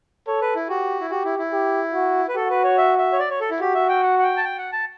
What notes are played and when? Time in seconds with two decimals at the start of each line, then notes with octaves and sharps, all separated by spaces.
0.27 A4 C#5
0.42 B4
0.55 E4
0.69 F#4 G4
1.01 E4
1.10 F#4 G4
1.25 E4
1.39 E4
1.52 G4
1.94 F#4
2.28 B4
2.36 F#4 A4
2.50 B4
2.64 C#5
2.78 E5
2.98 E5
3.12 C#5
3.20 D5
3.30 C#5
3.40 A4
3.51 E4
3.61 F#4 G4
3.75 E5
3.89 G5
4.03 F#5
4.19 F#5
4.23 G5
4.37 A5
4.45 G5
4.58 F#5
4.73 A5